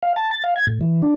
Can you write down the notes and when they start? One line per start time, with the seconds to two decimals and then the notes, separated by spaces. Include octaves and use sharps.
0.03 F5
0.16 A5
0.31 A6
0.44 F5
0.56 G#6
0.67 A2
0.81 E3
1.02 D4